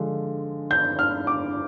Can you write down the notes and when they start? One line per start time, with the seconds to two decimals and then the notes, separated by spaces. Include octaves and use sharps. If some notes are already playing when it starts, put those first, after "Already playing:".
Already playing: D3 F3 G#3
0.71 G6
0.99 F6
1.27 D6